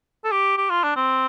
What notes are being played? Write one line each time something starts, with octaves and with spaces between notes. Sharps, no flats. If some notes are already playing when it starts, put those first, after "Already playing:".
A4
G4
G4
F4
D4
C4